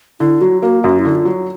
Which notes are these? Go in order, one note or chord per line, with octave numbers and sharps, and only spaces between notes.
D3 E4
F#3 F#4
A#3 F#4
F#2 F#4
E4
D3
F4
F#3